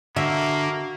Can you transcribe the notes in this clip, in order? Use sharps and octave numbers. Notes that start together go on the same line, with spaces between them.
D3 A#3 F#4 E5